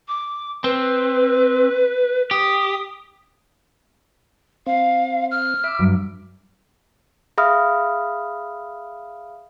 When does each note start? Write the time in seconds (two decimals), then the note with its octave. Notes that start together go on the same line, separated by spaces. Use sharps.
0.08 D6
0.64 C4 B4
2.31 G4 D#6
4.67 C4 F5
5.31 F6
5.64 E5 B5 D6
5.79 G2 F#3
7.38 G#4 E5 F5 B5 D#6 F6